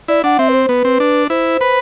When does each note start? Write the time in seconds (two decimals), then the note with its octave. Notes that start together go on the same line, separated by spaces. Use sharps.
0.08 E4 D5
0.24 D4 F#5
0.39 C4 E5
0.49 B4
0.54 C5
0.69 B3 B4
0.85 C4
1.00 D4
1.30 E4 C5
1.61 B4